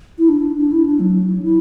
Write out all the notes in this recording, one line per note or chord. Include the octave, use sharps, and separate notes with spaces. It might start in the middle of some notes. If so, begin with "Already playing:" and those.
E4
D4
D4
E4
D4
F#3
E4